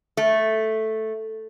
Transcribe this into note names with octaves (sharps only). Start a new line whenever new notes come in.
A3